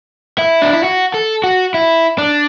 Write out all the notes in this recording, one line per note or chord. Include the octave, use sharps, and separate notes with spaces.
E4
D4
E4
F#4
A4
F#4
E4
D4